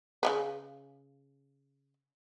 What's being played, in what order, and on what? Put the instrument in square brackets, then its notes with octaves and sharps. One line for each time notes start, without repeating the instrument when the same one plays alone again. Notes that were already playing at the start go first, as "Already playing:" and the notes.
[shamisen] C#3 F#3 B4